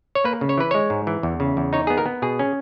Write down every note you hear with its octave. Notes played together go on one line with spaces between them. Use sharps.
C#5
A#3 B4
C#3
C#5
E3 B4
G#3 C#5
G#2
E3
E2
C#3
E2
D#4 C#5
B3 G#4
A#4
B3
B2 G#4
C#4